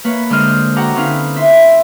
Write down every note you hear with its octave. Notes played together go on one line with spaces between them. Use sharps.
A#3 B4 C#5
D3 G#3 C5 D#5 F6
F#4 A4 F#5 G5 A#5 D6
D3 C4 C#4 D#4 B4 F5
E4 E5 C6